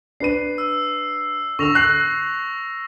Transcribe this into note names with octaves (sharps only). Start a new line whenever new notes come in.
D4 B4 C7 D#7
E6
D3 C#6 E6 A#6 F7
F#6 C7